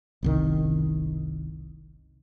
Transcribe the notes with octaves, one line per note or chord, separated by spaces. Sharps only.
F#1 C2 D#3